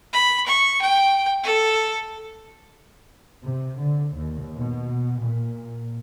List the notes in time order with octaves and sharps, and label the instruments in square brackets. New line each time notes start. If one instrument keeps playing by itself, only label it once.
[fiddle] B5
C#6
G5
A4
[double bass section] C3
D3
D#2
B2
A#2